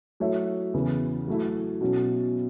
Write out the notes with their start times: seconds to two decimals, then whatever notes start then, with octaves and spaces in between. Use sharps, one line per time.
0.20 F#3 A3 E4 C#5 E5
0.74 E2 C#3 E3
1.27 F#3 A3 E4
1.81 B2 F#3 C#4 E4